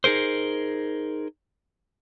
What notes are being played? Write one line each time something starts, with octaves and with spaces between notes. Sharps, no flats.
D#4 G#4 A#4 C5